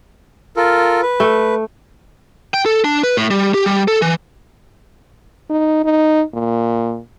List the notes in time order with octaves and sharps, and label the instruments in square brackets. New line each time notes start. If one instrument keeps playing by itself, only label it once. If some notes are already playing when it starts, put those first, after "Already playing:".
[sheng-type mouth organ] F4 A4 A#4
B4
[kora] A3
[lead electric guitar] G5
A4
D4
B4
A2
G3
G4
G3
A4
E3
[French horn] D#4
D#4
A#2